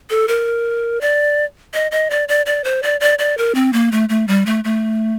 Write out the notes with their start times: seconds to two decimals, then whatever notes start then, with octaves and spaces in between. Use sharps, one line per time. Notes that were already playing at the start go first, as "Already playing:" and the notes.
0.10 A4
0.28 A#4
1.01 D5
1.74 D#5
1.92 D#5
2.10 D5
2.28 D5
2.46 D5
2.64 C5
2.83 D5
3.00 D5
3.19 D5
3.38 A#4
3.55 C4
3.73 A#3
3.92 A3
4.09 A3
4.28 G3
4.46 A3
4.64 A3